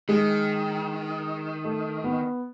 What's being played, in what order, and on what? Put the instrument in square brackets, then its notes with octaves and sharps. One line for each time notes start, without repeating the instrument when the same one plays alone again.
[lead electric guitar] D#3 [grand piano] G#3
[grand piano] A3
B3